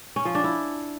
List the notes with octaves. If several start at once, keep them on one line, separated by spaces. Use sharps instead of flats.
C#4
F3
D4
E4